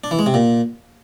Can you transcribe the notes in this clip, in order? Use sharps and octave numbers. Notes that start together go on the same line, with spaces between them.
D4
E3
G#3
C3
A#2